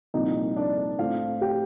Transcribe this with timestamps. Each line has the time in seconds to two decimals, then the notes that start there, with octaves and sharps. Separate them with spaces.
0.14 C2 A#2 F3 A#3 D#4 D#5
0.56 D4 D5
0.98 A2 A3 C4 F4 F5
1.41 G4 G5